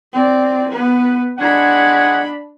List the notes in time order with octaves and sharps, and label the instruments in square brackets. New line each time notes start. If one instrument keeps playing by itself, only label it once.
[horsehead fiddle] C4 D5
B3 B4
[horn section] G#3 C#5 F#5 [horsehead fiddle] D4 B5